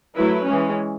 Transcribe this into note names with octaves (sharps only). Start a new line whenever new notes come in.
F#3 A3 E4 B4
E3 G#3 C#4